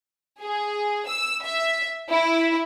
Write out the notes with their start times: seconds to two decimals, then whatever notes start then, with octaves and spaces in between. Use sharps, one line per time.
0.42 G#4
1.06 E6
1.44 E5
2.12 E4